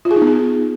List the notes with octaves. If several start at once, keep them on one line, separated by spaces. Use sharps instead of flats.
F4
G#4
D#4
B3
G#4